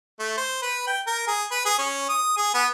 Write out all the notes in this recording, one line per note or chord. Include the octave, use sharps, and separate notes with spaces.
A3
C5
B4
G5
A#4
G#4
B4
G#4
C#4
D#6
G#4
B3